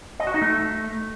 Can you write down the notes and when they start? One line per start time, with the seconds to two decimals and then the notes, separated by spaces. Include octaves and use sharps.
0.20 D#5
0.27 F#4
0.34 D#4
0.42 A3